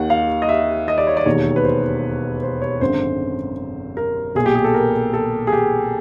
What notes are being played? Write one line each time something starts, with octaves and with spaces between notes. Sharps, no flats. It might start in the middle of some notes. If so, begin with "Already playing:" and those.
Already playing: D#2 D#3 F#5
F5
D#5
E5
D#5
D5
C#5
D5
E1 D#2 D#3 C#5
B4
C5
C5
C#5
G#1 F#2 D3 C5
A#4
B1 A#2 G#4
G4
G#4
A4
A#4
A4
G#4
G4